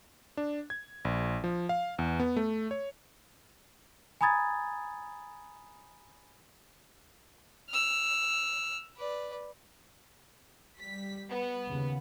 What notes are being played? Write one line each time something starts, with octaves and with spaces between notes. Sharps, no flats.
D4
G#6
A#1
F3
F5
E2
B3
A3
C#5
G#5 A#5 B5 D#6 G#6 A6
E6 F6
B4 D5
G3 B6
B3
D#2 C#3